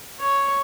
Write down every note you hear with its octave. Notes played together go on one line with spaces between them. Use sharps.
C#5